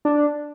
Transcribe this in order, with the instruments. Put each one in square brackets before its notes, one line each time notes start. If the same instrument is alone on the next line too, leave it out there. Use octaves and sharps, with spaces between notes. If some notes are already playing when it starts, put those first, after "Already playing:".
[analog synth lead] D4